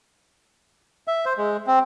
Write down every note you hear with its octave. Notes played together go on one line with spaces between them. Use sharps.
E5
C5
G#3
C4